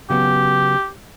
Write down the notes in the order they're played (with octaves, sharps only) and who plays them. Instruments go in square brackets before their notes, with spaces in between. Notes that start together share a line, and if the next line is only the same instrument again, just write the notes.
[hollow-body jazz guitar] C#3 F#3 B3 [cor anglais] G4